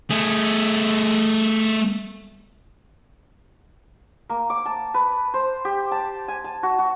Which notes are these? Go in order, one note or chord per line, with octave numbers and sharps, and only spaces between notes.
A3 G#4
A#3
D6
A5
B4
C5
G4
A5
G#5
A5
F#4
F#4